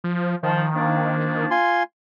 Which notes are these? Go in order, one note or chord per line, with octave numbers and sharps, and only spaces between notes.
F3
D#3 F3
F3 A#3 D4
F4 G#5 C6